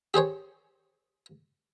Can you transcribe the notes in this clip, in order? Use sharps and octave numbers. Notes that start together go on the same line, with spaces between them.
G4 G#4 C5 C#5